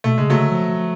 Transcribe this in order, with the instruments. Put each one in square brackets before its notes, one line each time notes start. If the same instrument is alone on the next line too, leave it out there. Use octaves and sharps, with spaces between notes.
[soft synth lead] B2 [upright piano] A3
[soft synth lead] C#3 [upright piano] G#3
[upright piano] F#3 A3
[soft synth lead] D3
F3